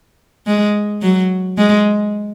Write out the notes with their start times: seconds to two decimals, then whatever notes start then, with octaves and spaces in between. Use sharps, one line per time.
0.47 G#3
1.02 F#3
1.58 G#3